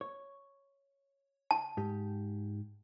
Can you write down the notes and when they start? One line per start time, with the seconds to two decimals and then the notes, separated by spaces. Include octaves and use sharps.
0.01 C#5
1.51 A5
1.77 G#2 G4